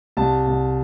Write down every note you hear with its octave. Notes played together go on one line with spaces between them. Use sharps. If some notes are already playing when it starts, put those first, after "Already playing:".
C2 A5
C2